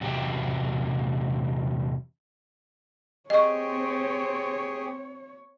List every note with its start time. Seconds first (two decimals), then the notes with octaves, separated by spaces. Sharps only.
0.01 E2 C3 F#3 G4
3.30 C4 G4 G#4 C#5 D#5 C#6